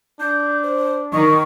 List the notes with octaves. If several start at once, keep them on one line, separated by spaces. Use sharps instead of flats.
D4 G6
C5
D#3 C#6